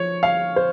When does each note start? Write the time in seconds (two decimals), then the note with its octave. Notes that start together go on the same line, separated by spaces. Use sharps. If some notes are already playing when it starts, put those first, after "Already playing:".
Already playing: F3 C#5
0.23 F5
0.56 C5